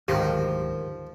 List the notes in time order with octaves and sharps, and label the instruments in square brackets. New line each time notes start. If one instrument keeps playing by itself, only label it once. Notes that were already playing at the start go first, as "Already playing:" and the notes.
[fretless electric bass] D1 D2 G#2 [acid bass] D#3 [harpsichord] F3 [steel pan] G4